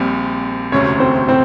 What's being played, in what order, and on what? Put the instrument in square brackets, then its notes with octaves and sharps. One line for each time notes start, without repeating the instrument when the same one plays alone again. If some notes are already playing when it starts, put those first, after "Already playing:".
Already playing: [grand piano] A#1 A#2 G3 [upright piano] C4
[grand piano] E1 D2 C3 [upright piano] C#4 C#5
[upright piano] C4 C5
C4 C5